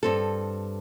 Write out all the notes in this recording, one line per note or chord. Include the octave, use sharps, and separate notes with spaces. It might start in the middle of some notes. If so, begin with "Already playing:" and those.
G2 C4 A4